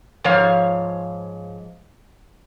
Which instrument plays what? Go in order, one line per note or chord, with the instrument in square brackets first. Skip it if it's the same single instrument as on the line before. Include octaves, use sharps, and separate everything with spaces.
[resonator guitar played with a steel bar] G#2 F3 C#5 F5